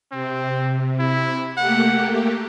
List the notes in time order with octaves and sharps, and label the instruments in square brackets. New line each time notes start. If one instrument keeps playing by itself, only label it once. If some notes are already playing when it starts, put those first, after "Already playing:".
[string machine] C3 [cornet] C4
[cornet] E4
[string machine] A3 A#3 G4 [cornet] F#5